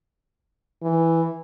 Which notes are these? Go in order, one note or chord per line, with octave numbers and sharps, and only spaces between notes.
E3